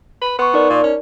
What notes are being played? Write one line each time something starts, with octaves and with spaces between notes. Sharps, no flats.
B4
B3 C6 C#6
D#4 A#4 D5
A#2
C#4